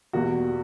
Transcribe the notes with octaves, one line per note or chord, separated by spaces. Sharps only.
E2 B2 G3 A#3 F#4